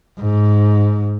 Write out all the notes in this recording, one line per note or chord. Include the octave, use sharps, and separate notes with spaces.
G#2